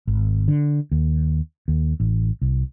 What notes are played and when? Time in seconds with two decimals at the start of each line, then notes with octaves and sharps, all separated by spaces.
0.07 G#1
0.48 D3
0.91 D#2
1.68 D#2
2.00 A1
2.42 C2